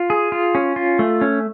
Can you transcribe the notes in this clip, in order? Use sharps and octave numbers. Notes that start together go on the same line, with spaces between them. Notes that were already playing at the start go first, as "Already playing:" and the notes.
Already playing: F4
G#4
F4
C#4
F4
A3
C#4